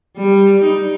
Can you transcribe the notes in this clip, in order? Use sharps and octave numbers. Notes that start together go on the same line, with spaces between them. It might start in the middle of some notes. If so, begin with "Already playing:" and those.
G3
D#4